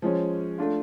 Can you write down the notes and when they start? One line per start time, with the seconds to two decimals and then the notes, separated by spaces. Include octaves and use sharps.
0.02 F3 G#3 C#4
0.58 A3 D4 F4